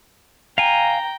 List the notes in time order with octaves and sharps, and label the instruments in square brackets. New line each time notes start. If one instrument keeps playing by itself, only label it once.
[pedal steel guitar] F5 G#5 [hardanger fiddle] G5 A#5